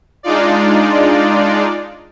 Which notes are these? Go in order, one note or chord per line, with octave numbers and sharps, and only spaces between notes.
G#3 D4 D#4 F4 D5